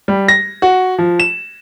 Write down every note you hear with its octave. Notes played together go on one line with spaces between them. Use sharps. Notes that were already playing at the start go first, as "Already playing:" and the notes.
G3
A#6
F#4
F3
E7